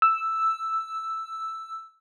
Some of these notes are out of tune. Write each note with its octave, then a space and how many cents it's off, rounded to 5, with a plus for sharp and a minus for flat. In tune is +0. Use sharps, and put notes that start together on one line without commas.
E6 +0